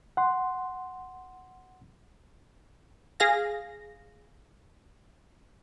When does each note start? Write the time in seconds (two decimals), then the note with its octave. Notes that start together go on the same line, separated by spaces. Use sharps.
0.17 F#5 C6
3.20 G#4 F5 A#6